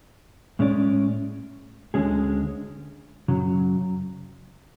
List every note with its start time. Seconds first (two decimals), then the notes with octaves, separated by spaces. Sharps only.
0.59 A2 G#3 C#4 G#4 D5
1.94 D2 D3 G#3 C#4 G#4
3.28 F#2 C#3 F#3